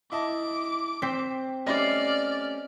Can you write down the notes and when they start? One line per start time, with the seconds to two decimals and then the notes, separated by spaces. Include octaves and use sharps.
0.12 E4 D#5 A5 D6
1.02 C4 C5 B6
1.67 G3 A3 C#4 D5 D#5 F6 C7